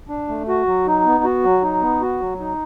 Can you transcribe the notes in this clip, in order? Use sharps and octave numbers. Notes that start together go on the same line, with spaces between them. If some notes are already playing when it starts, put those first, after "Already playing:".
D4
A3
F#4
F#3
D#4
B3
F#4
F#3
D#4
B3
F#4
F#3
D#4